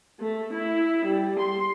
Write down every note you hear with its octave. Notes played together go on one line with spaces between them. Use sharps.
A3
E4
G3
C6